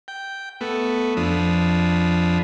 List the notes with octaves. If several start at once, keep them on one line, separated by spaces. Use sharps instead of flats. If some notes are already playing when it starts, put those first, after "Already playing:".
G5
A3 B3
F2 F3 D4 B5 D#6